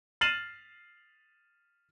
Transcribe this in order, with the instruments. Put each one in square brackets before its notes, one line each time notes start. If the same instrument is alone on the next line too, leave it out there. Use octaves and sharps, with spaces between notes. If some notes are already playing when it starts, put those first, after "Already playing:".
[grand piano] F6 A6 C7 D#7 E7 F#7